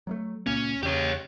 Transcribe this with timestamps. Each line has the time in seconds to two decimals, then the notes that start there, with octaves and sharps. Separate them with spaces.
0.07 F#3 G#3 A3
0.47 C#2 A#2 A#3 C#4
0.83 E2 C#3 G4 C#5